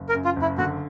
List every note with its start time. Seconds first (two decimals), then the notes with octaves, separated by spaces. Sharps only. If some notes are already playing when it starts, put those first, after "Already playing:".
Already playing: F#1
0.09 A#4
0.15 F#2
0.25 F4
0.36 F#1
0.42 E4
0.58 D3 F#4